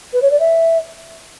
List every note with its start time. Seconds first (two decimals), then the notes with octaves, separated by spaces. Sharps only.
0.13 B4
0.22 C#5
0.31 D5
0.40 E5